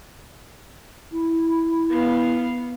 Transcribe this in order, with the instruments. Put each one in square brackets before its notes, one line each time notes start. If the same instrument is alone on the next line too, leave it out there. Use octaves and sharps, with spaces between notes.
[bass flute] E4
[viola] B3 F5